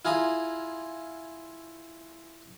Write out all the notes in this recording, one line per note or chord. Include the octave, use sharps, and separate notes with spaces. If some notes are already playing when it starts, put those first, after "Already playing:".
E4 F4 G#4 A#5 D#6